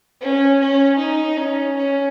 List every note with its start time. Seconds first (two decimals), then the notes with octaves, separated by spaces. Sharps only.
0.21 C#4
0.59 C#4
0.98 D#4
1.37 C#4
1.77 C#4